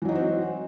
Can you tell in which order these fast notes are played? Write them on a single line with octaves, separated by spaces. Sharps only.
E3 F#3 D#4 F#4 C4